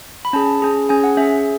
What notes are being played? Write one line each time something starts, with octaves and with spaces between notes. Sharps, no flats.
B5
C#4 G#4 A5
C#4 G#4
C#4 G#4 G#5
F#5
C#4 G#4 E5